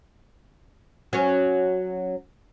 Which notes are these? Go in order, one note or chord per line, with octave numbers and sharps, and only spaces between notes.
F#3 C#4